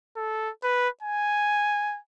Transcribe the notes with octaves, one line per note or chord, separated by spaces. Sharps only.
A4
B4
G#5